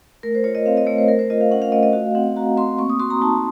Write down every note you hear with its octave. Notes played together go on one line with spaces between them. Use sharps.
A3 A#4
C5
F4 C#5
D#5
C4 F5
D#5
A3 C#5
C5
A3 A#4
C5
F4 D#5
F5
C#4 F#5
F5
A3 D#5
D#5
F#4 F5
C4 F#5
F#4 A#5
C4 C6
A#3 C#6
D#6
F#4 C6
A#5
D#4 A5